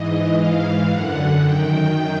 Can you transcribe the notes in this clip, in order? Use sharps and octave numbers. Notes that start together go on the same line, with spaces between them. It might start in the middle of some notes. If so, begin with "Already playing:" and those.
Already playing: G#2 E3 D#5
G#2 E3 F5
F#2 D3 F#5
F#2 D#3 G5